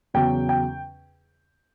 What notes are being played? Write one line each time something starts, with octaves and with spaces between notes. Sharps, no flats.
E2 C#3 F#3 C#4 G5
G5